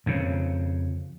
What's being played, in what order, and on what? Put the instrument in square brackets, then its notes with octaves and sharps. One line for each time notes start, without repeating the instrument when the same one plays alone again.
[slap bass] F2 C#3